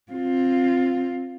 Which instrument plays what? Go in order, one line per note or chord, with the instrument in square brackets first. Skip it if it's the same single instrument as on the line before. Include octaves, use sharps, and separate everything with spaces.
[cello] C4 F4